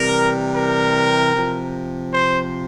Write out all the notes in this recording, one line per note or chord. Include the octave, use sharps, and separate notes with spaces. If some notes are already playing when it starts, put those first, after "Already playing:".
Already playing: C3 E3 G3 A#4
A#4
C3 F3
C5